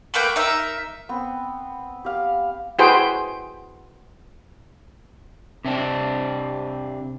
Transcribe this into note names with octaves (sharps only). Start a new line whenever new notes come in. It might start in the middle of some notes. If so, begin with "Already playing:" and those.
A3 A#3 B4 G5
D#4 A#4 E5
B3 C4
G4 F5
E4 F#4 G#4 B4 C5 G5
C3 C4 D4